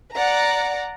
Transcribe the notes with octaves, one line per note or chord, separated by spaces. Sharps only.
D5 F#5 A#5